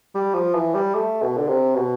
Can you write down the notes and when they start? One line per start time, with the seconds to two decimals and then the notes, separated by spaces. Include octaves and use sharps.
0.15 G3
0.34 F3
0.54 E3
0.75 G3
0.95 A3
1.22 B2
1.37 D3
1.48 C3
1.75 B2